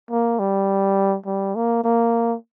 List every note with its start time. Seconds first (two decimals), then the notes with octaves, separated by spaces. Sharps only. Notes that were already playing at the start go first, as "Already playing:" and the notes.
0.11 A#3
0.39 G3
1.26 G3
1.55 A#3
1.84 A#3